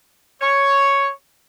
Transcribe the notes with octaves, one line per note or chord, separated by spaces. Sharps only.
C#5